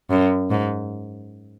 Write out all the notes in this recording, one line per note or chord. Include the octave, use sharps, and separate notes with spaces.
F#2
G#2